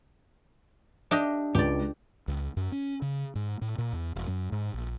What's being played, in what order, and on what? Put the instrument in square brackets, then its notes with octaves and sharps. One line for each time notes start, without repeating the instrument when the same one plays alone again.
[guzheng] D4 G4 D#5 [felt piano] E5
[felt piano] C#2 [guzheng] G4 D5
[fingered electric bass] C#2
F#2
C#4
C#3
G#2
A2
A#2
E2
E1
F#2
G#2
A#1